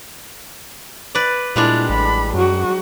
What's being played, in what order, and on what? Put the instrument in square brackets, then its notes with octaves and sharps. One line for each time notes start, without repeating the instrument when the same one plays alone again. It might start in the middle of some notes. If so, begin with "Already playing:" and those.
[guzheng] B4 D5
[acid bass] A#2 [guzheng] G3 G#3 D4 [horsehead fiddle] E4
[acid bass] A1 [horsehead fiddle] B5
[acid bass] F#2 [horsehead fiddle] F#3 F#4